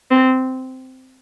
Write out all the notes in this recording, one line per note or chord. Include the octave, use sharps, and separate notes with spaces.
C4